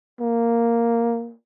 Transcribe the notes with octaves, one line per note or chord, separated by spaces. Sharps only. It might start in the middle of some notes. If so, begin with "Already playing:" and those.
A#3